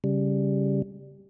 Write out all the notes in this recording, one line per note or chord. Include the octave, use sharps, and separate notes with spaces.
C#3 G3